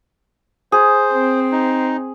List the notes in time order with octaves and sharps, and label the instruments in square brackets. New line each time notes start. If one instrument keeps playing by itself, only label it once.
[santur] G#4 [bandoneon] C5
[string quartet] C4
[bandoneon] D#4